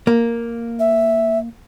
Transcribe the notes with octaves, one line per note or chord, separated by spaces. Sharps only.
A#3
E5